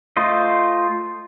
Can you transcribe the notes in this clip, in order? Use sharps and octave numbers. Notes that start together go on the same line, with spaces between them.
A3 F4 C5 D#5